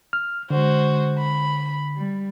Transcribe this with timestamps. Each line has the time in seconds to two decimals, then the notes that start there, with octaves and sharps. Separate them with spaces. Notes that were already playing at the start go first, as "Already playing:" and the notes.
0.13 F6
0.50 D3 G#3 F#4 C5
1.19 B5
1.96 G3